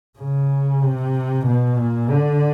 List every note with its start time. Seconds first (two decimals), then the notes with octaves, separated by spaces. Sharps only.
0.19 C#3
0.82 C3
1.46 B2
1.78 A#2
2.11 D3